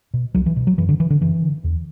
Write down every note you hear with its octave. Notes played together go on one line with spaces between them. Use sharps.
B2
C2 F#3
E3
B2
F#3
F#2 E3
D3
D3 E3
D3
F#2 E3
D3
E2